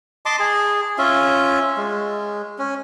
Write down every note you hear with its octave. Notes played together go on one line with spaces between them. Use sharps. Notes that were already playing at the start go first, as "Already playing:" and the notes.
D#5 A5 C6 D6
G#4
C#4 F4 E5
G#3
C#4